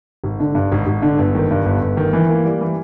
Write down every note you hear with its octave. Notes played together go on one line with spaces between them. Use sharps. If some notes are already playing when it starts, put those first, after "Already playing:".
G#1
D3
G2
G#1
G#1
D3
G1
D#3
G2
G1
G1
D#3
E3
A#3
G3
E3